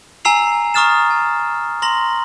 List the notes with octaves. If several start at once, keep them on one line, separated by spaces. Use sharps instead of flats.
G#5 A#5 E6 C7 F7
A#5 C#6 D#6 F6 A6 E7
G#5
A#5 C6 A#6 F#7